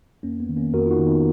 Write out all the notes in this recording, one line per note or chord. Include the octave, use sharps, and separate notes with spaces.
F2 A#3 C#4
B3
D#3
A#3 C#4
F2 F#4 A#4
F4
D#4 F#4
D#3
B3 D#4